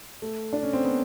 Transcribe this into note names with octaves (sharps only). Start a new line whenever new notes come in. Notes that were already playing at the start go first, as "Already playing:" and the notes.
A3
D4
C#4
C4
B3